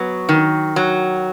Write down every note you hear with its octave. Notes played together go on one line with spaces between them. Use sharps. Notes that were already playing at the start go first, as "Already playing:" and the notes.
Already playing: F#3 B3
D#3
F#3